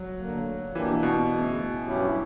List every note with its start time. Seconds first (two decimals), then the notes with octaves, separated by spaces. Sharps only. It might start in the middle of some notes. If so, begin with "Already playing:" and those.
Already playing: F#3
0.20 D2 D3 A#3
0.75 B2 E3 A#3 D4 G4
1.03 B2
1.31 D2 C#3 E3
1.86 G2 F#3 C#4 E4 G4